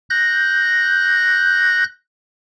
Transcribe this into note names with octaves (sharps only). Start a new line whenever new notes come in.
F#6 G6 A#6